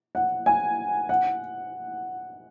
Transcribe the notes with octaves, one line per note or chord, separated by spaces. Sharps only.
F#5
G#5
F#5